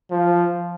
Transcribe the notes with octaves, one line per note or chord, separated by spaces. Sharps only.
F3